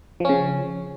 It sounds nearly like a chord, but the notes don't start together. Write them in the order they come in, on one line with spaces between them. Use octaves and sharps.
F3 C#4 C#3